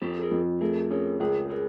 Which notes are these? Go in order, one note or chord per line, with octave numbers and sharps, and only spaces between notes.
F2 G4 A4
G#4 A#4
F2
A3 G#4 A#4
C#4 G#4 A#4
C#2 G#4 A#4
G#4 A#4